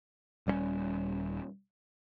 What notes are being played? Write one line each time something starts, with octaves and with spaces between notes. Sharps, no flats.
D#1 G3 A3 C#4